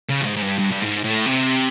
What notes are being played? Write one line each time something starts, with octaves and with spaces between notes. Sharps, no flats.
C#3
G2
G#2
G#2
G2
G2
G2
G#2
A2
C3